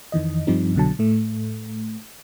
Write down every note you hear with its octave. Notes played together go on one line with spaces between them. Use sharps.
F2 D#3 E3 D#5
G2 F3 G3 C4 D#4
C2 B2 D3 F#3 A5
A2 A3